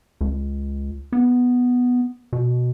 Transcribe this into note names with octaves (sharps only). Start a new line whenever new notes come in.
C#2
B3
B2